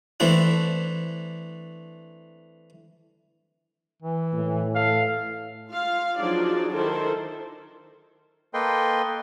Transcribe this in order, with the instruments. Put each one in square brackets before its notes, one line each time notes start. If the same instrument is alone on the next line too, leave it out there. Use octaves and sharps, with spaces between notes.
[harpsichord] E3 A3 C4 D4 E4
[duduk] E3
[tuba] A2
[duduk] A4 [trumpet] F5
[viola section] F4 F5
F3 F#3 D4 D#4 G#4 D5
D#3 E4 A4 A#4 C5
[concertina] A#3 A4 B4 D#5 G5 C6